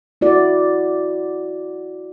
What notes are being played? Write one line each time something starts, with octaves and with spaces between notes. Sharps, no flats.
E4 F#4 D5